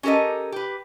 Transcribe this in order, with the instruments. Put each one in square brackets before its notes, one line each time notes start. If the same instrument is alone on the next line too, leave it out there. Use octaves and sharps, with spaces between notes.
[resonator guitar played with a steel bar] C#4 G4 A4 A#4 D#5
G4 B4